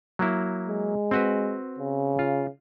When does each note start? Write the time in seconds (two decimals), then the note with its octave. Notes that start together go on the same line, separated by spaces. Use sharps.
0.19 F#3 A#3 E4
0.68 G#3
1.11 C4 F#4 B4
1.78 C#3
2.19 F4